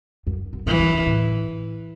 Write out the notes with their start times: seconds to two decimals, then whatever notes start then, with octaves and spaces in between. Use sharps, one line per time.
0.27 F#2
0.53 F#2
0.66 G#2 E3
0.80 F#2
0.94 F#2
1.07 A2